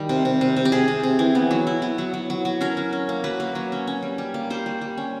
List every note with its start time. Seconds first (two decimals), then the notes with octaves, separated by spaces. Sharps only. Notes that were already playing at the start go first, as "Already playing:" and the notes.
Already playing: D#3 G3
0.09 C3
0.25 C3
0.41 C3
0.56 C3
0.65 G4
0.72 C3 G#4
0.88 C3
1.03 C3
1.19 E3
1.35 B3
1.51 F#3
1.67 E4
1.82 B3
1.98 F#3
2.14 F#3
2.30 F#3
2.45 F#3
2.61 C#4 A#4
2.77 F#3
2.93 C#4
3.09 A#3
3.24 F#3 B4
3.40 A#3
3.55 F#3
3.72 C#4
3.87 C#4
4.02 G3
4.18 G3
4.34 A#3
4.50 G3 C5
4.66 G3
4.81 G3
4.97 C#4